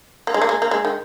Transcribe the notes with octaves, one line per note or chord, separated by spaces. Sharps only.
A#3
G#3
A#3
G#3
A#3
G#3
D#3